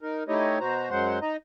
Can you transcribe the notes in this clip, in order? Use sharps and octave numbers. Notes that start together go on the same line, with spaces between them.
D#4 A#4
A3 D#4 E4 G4 C#5 D#5
B2 F#4 C5 A#5
F#2 F#3 G#3 C5 F#5 C6
D#4 D#5 A#5